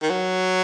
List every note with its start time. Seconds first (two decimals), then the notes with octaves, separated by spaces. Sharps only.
0.02 D#3
0.10 F#3